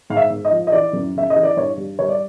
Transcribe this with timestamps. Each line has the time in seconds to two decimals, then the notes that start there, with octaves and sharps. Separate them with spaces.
0.10 G#2 F5
0.17 E5
0.30 G#2
0.45 D#5
0.51 F3
0.67 D#5
0.72 E3 D5
0.93 F#2
1.15 C#3 E5
1.30 D#5
1.36 E3
1.43 D5
1.57 G2 C#5
1.78 G3
1.99 G3 C#5
2.09 D5